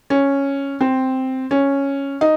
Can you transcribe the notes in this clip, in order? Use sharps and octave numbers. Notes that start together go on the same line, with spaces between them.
C#4
C4
C#4
D#4